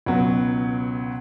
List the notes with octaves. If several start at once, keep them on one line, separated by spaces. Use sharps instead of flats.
C#2 B2 F#3 B3 F#5